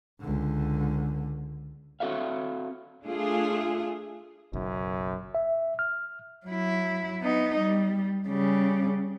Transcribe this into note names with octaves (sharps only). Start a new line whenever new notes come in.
C#2 D3
C4 F#4 A4 E5 F5
A3 D4 F4 G#4
F#1 B1 F#2
E5
F6
F#3 E4
B3 D#4
G3
C#3 G3